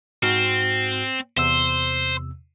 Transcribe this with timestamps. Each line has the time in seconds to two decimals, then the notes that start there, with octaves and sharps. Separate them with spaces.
0.23 G#2 C4 F#4 F6
1.37 E2 C3 C5 E6